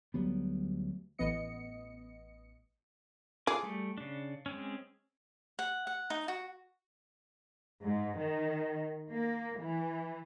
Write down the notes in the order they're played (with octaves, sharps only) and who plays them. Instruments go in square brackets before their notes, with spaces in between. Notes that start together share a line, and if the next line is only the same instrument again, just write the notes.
[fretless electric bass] D2 F#3 G3 B3
[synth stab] A1 B3 D#5 C#7
[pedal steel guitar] F4 D6 [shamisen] G#4
[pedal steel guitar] G3 A3
C#3 D4
G#3 C4 C#4
[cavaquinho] F#5
F#5
D#4
F#4
[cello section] G#2
D#3
A#3
E3